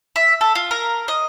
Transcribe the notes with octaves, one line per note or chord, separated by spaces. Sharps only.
E5
A4
F4
A#4
D#5